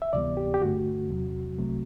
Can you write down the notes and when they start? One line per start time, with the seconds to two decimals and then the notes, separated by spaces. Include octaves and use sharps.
0.02 E5
0.13 D2 C3 E3 G3 B3 D5
0.37 G4
0.54 G4
0.62 G2 D3 A3 F#4
1.09 E2 C3 F#3
1.58 C2 C3 F#3 A3